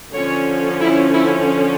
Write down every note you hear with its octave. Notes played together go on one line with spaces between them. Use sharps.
D3 F3 C#4 C#5
E4
E4